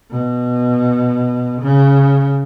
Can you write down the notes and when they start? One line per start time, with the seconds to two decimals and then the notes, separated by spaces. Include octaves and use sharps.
0.11 B2
1.62 C#3